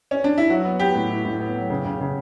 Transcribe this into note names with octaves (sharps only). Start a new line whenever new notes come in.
C#4
D4
E4
F#3 F#4
B3
B3 G4
A2
E4
A2
B3
F#3
C#3
C#3
C#3